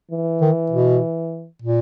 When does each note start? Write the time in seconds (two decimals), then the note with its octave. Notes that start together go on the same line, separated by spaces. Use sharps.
0.11 E3
0.41 D#3
0.71 B2
1.62 A#2